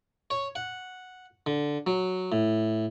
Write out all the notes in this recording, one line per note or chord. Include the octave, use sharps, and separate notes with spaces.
C#5
F#5
D3
F#3
A2